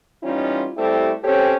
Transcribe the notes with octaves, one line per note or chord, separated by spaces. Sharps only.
E3 G3 C#4 D#4 F4
G3 A3 C4 E4 G4 A4
C4 C#4 G4 A4 C5 C#5